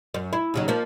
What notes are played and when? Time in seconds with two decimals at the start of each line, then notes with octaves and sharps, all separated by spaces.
0.14 F#2
0.33 E4
0.54 D#2 C#3 F#3
0.68 F3 A#3